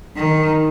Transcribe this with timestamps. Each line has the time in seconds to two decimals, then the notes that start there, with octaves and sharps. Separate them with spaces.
0.16 D#3